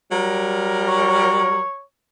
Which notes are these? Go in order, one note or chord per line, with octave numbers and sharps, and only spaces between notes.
F#3 G3 A#4
C#5